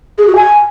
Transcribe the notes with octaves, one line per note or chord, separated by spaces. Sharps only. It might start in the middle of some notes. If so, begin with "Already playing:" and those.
G#4
F#4
G#5